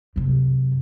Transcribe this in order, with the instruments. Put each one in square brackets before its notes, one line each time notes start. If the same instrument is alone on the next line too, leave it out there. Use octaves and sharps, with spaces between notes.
[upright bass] F#2 C3